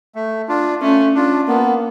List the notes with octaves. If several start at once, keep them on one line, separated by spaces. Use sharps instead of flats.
A3
D4 F4
A3 C#4
D4 F4
A#3 B3